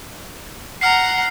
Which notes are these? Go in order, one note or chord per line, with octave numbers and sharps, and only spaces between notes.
F#5 A#5 F6 C7